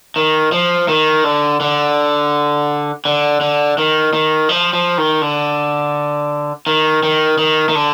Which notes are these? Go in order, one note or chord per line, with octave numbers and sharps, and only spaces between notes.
D#3
F3
D#3
D3
D3
D3
D3
D#3
D#3
F3
F3
D#3
D3
D#3
D#3
D#3
D#3
D3